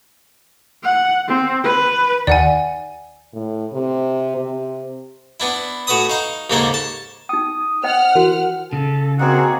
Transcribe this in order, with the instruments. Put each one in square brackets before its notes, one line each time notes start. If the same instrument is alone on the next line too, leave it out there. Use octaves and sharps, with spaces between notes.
[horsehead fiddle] F#5
C4
B4
[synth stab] D#2 D#3 [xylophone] D5 F#5 G#5
[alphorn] A2
C3
C3
[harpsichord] B3 D4 E4
A2 F#4 B4 B5 D#6
D#4 F5
D#2 G#2 C#3 A#3 A4 A#4
A5
[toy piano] D#4 G5 [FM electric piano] D#6
[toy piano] C5 D#5 G5 [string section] F#5 F6
[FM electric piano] E3 [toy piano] F#4 A#4
[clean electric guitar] C#3 [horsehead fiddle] A4
[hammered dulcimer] D#3 A#3 C#5 [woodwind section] C4 F#5 [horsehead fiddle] F#4 G#4